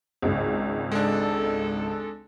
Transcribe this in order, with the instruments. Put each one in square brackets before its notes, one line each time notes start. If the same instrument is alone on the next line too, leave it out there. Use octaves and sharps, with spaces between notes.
[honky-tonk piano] G#1 C#2
[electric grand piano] G#3 D4 [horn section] A4